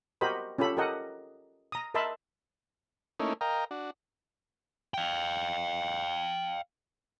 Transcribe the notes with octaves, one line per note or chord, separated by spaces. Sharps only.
F#4 G4 A#4 C5 D#5 B5
C#4 F4 G4 A4 B5
G4 A4 A#4 D#5 F#5
A#5 D#6
A#4 D#5 E5 A5 B5 C6
A3 A#3 C#4 D#4 E4
A#4 D#5 F5 G5 A#5
D4 F#4
F5 G5